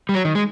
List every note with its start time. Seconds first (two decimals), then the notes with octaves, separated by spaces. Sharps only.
0.09 G3
0.14 F#3
0.25 D#3
0.35 G#3